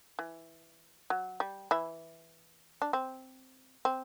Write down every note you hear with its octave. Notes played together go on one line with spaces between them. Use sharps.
E3
F#3
G3
E3 E4
D4
C4
C4